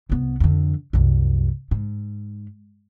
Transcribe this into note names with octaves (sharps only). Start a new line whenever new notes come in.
C2 B3
F2 D3
C2 F#2
G#2